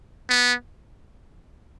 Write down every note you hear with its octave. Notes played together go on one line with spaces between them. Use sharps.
B3